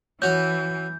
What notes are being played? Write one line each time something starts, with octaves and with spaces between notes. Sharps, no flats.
E3 C#4 F#4 C#5 G6